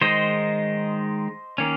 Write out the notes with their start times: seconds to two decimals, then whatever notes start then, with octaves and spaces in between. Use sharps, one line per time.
0.01 D#3 G#3 D#4 C5 D#5
1.58 D#3 A#3 C#4